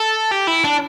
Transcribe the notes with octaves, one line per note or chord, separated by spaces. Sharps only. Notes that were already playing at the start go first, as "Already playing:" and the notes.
Already playing: A4
G4
E4
D4